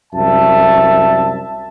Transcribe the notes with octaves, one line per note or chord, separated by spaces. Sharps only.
C2 F#2 E5 A5